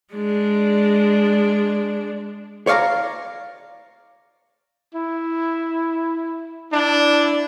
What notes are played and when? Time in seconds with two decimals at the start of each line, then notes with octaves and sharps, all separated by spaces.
0.13 G#3 D4
2.67 C#5 D5 F5 A5 A#5
4.95 E4
6.72 D4 E4